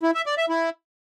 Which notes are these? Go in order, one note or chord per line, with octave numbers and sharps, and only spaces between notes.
E4
E5
D5
E5
E4